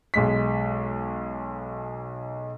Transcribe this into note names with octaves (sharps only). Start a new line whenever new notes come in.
B1 G#3 B6